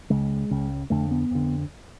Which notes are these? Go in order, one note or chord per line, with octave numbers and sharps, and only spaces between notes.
C#2 C#3 G#3
C#2 C#3
F2 D3 A3
B3
F2 D3